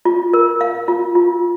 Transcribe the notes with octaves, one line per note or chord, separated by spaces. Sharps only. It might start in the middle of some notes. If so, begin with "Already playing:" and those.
F4
A#4
F5
F4
F4